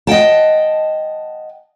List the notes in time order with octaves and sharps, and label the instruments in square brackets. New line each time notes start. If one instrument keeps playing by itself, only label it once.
[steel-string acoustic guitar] D#5 F#5 G5 A5